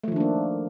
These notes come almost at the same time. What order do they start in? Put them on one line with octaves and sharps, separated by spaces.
A3 F3 D#3 D4 A#3